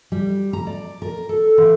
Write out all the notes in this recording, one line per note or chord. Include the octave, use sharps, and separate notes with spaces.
G3
A#5
D5
A#4
A4
E3